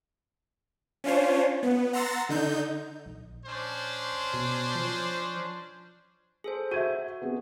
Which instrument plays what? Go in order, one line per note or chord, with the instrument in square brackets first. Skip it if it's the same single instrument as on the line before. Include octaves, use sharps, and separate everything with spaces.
[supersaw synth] C#4 D4 F4 C5 C#5
B3
F#5 A#5 C6 E6 A6 A#6
D3 D#4 G6
[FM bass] A#1
[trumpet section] C#4 D4 C5
[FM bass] B2
F3
[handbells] G#4 A4 C5
[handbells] F#4 [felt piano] E5 G#6 D#7
[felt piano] B3 C4 G#4